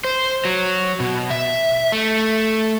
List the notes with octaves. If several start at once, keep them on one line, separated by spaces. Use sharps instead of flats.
C5
F#3
B2
E5
A3